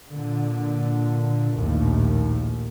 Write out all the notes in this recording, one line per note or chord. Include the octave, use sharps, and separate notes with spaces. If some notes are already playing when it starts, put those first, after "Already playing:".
A#2 D3
A#1 D#2 A2